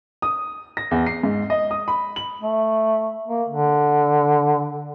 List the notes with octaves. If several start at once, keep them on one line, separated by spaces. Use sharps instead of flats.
D#6
A#6
E2
C7
G#2
D#5
D#6
B5
F#7
A3
A#3
D3